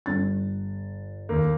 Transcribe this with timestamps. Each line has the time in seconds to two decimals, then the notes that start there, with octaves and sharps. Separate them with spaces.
0.06 G1 A6
1.29 D#2 A#3